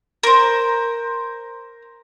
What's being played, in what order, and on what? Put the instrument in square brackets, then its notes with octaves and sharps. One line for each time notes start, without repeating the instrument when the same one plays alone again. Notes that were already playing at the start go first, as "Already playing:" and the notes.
[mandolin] A#4 C5